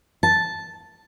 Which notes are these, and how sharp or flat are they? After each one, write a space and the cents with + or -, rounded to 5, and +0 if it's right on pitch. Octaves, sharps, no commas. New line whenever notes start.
A5 -5